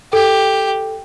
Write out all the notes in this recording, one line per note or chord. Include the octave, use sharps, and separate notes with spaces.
G4 A4